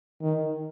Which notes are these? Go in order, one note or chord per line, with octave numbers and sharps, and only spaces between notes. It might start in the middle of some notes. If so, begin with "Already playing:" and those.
D#3